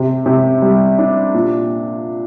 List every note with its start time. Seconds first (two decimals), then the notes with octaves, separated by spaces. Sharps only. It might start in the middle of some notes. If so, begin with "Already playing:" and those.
Already playing: C3
0.26 C3
0.62 G3
0.98 D4
1.34 A#2